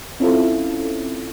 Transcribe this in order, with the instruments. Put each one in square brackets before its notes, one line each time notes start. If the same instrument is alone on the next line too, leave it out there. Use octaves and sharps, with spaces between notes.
[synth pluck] C4 C#4 E4 F4 A4